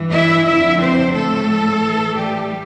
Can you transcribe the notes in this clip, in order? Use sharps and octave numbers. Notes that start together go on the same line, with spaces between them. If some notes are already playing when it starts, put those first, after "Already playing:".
Already playing: G2 E3
E4 E5
F2 D3 F3 E4 E5
C4 C5
A2 F3 A3 A4
A2 E3
G3 G4